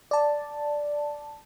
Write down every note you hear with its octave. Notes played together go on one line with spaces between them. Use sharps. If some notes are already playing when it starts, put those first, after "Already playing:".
D5 A5